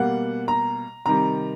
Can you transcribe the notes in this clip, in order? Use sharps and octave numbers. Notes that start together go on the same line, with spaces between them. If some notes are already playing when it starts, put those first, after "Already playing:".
Already playing: B2 G3 A#3 F#5
A#5
C3 D#3 G3 A#5